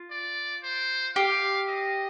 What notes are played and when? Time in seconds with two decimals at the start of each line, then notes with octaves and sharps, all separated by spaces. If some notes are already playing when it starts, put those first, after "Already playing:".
Already playing: F4
0.11 D5
0.63 C5
1.16 G4 F5
1.68 D#5